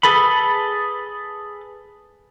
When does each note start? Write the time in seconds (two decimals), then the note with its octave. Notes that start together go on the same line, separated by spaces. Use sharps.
0.03 G#4 A4 B4 B5